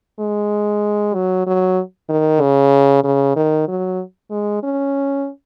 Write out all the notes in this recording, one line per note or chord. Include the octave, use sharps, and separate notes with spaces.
G#3
F#3
F#3
D#3
C#3
C#3
D#3
F#3
G#3
C#4